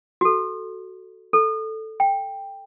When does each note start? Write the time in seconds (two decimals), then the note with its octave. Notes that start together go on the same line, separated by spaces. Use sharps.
0.21 F#4 A4
1.33 A4
2.00 G5